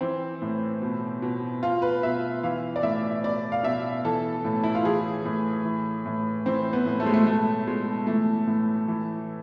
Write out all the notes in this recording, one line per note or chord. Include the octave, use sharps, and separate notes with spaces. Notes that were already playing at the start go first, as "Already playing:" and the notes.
E3 C4
A2
B2
B2
B2 F4
B4
B2 E5
E3 F5
D5
A2 E5
B2 D5
F5
B2 E5
E3 A4
A2
E4
F4
E3 G#4
A2
E3
A2
E3 C4
B3
A2
A3
G#3
A3
B2 A3
B2 G#3
E3 A3
A2
E3